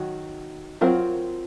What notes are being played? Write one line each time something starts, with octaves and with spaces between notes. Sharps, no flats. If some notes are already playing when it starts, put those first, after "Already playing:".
Already playing: D#3 F#3 F#4
F#3 C4 F4 A#4